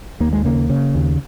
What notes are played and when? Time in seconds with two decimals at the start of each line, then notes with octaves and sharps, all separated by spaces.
0.20 D#2 A#3
0.33 G#3
0.45 C#3 A#3
0.70 C#3
0.95 D#2